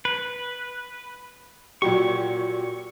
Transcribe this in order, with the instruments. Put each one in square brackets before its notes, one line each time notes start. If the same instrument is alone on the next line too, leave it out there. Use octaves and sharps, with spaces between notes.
[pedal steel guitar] B4
[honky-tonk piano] A#2 F#3 G4 [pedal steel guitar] C#6